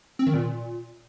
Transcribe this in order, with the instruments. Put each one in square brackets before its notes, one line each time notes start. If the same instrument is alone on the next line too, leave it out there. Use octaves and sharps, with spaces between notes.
[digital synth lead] C4
D#3
A#2